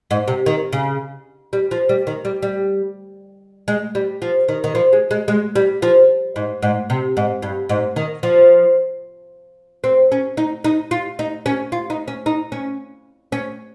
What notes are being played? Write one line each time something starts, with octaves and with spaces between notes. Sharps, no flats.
G#2
C3
D#3
C#3
G3
F3
G3
D#3
G3
G3
G#3
G3
F3
D#3
D#3
F3
G#3
G#3
G#3
G3
F3
G#2
G#2
C3
G#2
G2
G#2
D#3
F3
C4
C#4
D#4
D#4
F4
D#4
C#4
F4
D#4
C#4
D#4
C#4
C#4